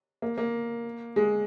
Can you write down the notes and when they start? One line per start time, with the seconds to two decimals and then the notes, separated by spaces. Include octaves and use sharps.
0.22 A#3
0.38 A#3
1.16 G#3